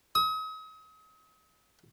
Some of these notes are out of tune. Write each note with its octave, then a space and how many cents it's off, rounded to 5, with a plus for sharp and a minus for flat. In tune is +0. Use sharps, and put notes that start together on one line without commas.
D#6 +40